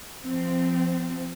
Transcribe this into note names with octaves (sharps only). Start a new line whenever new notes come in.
F3 C4